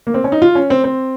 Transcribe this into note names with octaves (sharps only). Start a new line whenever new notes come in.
A#3
C4
C#4
D#4
F4
C#4
C4
C4